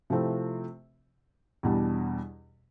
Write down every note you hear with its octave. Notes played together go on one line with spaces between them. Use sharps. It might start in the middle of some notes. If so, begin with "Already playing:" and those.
C3 F3 A3 C4 E4
E2 B2 G3 D4